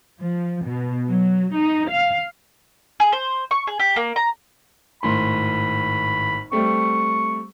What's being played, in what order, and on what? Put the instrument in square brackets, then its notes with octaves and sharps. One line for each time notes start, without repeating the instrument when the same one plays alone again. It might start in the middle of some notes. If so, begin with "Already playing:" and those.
[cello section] F3
B2
F#3
D#4
F5
[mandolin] G#4
C5
C#6
G#4
G4
A#3
A#5
[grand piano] G#1 A2 C6 [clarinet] B5
[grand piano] G3 A3 C4 [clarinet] C#6